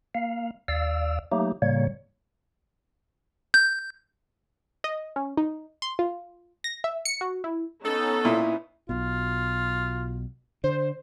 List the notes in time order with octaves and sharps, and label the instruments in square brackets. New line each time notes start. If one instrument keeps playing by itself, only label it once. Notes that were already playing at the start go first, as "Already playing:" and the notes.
[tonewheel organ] A#3 F5
D#2 D5 F5 E6
F#3 A3 A#3 D#4 G4
A2 C#3 G3 A#3 C#5
[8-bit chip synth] G6
[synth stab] D#5
C#4
D#4
C6
F4
A#6
E5
C#7
F#4
E4
[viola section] B3 C#4 D#4 [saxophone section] A4
[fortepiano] A#2 [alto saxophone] E4
[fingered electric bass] B1 B2 [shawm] F4
[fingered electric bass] D3 [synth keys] C5